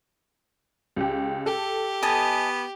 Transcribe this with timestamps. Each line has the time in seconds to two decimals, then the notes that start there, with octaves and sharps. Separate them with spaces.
0.96 C#2 G4
1.46 G4 A4
2.03 B3 D#5 G#5 A5